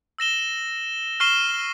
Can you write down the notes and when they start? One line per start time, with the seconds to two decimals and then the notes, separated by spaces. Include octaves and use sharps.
0.18 E6 A#6 E7 G7
1.20 C#6 F6 C7 E7 G7